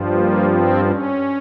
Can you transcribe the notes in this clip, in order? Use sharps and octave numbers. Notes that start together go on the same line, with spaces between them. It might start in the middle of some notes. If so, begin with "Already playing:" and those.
Already playing: G2 F3
A#3
C4
C#4